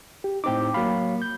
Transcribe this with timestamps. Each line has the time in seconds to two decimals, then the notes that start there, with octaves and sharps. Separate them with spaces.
0.24 G4
0.44 A2 C4 D#4 G5 D6
0.74 F#3 A#3 F5 B5
1.22 G6